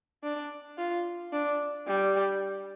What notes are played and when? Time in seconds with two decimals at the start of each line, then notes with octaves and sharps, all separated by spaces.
0.24 D4
0.78 F4
1.32 D4
1.87 G3